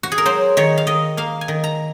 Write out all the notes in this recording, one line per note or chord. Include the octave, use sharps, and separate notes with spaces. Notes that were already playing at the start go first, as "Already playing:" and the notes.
F#4
G#4
A#4
F#3 C5
D#3 C#5
F5
D#3 D#5
A#3 F5
G#5
D#3
A#5